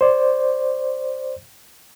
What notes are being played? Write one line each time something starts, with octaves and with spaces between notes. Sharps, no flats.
C5 D5